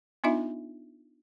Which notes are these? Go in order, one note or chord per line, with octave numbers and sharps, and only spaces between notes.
B3 D4 D#4 F4 D#5 E5